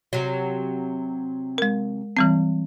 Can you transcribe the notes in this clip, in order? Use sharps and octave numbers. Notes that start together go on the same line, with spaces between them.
C3 F#3
G#3 A#4
E3 G3 C4